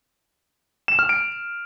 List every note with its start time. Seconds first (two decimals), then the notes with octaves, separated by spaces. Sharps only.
0.88 E7
0.99 F6
1.09 D7